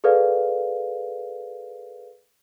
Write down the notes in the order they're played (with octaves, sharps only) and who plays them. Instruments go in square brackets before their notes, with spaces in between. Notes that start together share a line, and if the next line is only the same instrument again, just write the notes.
[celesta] G#4 A4 B4 D5 F5